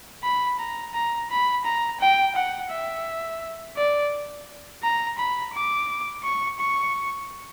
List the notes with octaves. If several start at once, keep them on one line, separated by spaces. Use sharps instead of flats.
B5
A#5
A#5
B5
A#5
G5
F#5
E5
D5
A#5
B5
D6
C#6
C#6